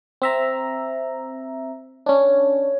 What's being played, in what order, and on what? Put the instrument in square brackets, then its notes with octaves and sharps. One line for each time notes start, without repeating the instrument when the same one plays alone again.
[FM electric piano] C4 E5 A#5
[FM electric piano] C#4 D4 [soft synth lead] C#5